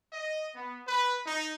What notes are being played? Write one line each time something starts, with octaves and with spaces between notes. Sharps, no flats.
D#5
B3
B4
D#4